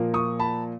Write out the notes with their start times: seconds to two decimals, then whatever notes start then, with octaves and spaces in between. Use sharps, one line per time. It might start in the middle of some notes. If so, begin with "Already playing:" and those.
Already playing: A#2 F3 A#3
0.14 C#6 D#6
0.39 A5 B5